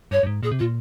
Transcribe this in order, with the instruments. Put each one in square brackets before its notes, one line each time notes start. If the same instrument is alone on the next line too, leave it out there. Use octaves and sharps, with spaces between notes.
[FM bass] G2 [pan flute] C#5
[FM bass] G2
G#2
[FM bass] A#2 [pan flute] G#4
[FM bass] C3
[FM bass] A#2 [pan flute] F4